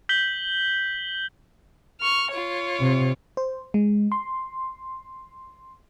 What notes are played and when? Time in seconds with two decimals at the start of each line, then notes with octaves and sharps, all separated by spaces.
0.09 G6 B6 F#7 G7
2.01 C#6 F6
2.31 F4 C#5
2.80 C3
3.37 C5
3.74 G#3
4.12 C6